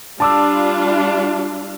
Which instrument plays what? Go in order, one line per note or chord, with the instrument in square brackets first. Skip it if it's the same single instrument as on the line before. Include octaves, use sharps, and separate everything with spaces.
[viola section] G3 D4 F4 [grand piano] A5 D6 E6